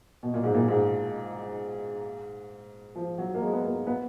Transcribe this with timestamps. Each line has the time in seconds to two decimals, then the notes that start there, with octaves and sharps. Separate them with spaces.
0.23 B2
0.34 A#2
0.43 G#2
0.54 A#2
0.68 G#2
2.95 F3
3.18 F#3
3.34 A#3
3.41 G#3
3.53 B3
3.64 A#3
3.87 B3